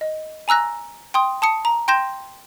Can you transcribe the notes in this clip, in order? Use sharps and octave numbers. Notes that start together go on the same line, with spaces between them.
D#5
G#5 A#5 E6 F#6 A#6
G5 C6 D#6
A5 D#6 C#7
A#5
G5 C6 G6 A#6 E7